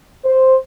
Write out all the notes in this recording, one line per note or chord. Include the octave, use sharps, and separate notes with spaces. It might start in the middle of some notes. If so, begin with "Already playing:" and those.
C5